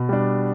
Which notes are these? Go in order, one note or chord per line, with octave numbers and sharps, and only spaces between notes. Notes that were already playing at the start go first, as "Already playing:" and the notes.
Already playing: B2
G3 D4